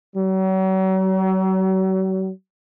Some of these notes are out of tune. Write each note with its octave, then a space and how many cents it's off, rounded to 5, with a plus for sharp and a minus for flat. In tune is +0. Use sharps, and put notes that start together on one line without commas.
F#3 +40